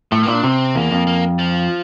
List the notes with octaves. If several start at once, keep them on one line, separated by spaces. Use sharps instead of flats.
A2 A3
A#3
A#2 E4
D4
C3 C4
E2 A#3
F2
A#3
F3